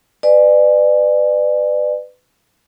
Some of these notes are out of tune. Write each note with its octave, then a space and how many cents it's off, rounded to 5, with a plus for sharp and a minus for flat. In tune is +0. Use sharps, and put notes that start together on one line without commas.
B4 +25 D5 +30 G#5 +0